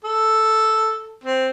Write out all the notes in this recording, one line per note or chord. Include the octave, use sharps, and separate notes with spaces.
A4
C4